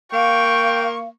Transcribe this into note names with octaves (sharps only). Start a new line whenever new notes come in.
A#3 F5 G5 C#6